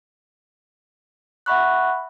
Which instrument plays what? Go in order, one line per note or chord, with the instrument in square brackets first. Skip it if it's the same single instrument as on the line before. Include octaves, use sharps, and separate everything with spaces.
[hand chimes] E5 F#5 B5 C#6 F#6